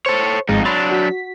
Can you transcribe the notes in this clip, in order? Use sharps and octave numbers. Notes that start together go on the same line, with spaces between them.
A4 C5 C#5
G#1 F2 G#3 D#4
F#3 D4 B5 C6 A6
F#4 B6